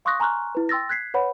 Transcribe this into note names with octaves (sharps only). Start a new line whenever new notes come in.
F5 C6 C#6 D#6 F#6 A#6
G#5 A#5 C6 C#6 F6 F#6
E4 B4
G5 C6 E6 A6 A#6
F#6 G#6 B6 C7
B4 C#5 F#5 B5